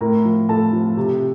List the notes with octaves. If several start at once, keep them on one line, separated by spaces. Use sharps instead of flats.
A2 A#4 A#5
F3
A2 A4 A5
F3
C3